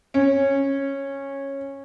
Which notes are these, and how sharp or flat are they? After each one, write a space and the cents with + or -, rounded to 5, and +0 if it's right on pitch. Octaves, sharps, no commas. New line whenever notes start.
C#4 -10